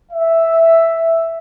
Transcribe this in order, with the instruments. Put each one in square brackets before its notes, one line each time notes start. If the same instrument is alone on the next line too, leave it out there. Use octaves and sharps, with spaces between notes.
[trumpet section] E5